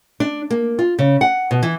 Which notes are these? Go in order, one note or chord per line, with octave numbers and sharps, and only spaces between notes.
D4
A#3
F4
C#3
F#5
B2
E3